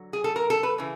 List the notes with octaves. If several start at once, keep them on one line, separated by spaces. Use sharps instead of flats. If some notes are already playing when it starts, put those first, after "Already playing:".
Already playing: D3 F#3
G#4
A4
A#4
A4
B4
C#3 E3